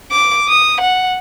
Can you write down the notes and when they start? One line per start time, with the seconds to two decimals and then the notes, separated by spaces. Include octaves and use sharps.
0.12 D6
0.48 D#6
0.81 F#5